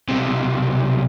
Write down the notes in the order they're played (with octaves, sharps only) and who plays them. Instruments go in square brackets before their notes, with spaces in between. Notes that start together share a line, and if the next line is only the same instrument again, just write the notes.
[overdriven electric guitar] B1 C3